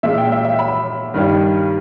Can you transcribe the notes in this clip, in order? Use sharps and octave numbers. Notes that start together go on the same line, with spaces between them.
A#2 G#3 E5
G5
E5
E5
B5
G2 D#3 G3